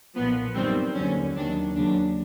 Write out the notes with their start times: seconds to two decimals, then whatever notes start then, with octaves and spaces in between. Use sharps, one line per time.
0.15 B1 A#2 F3 B3
0.55 F#2 D#3 G3 C4
0.94 D#2 D3 F#3 C#4
1.34 D#2 D#3 F#3 D4
1.74 D#2 C#3 F#3 D4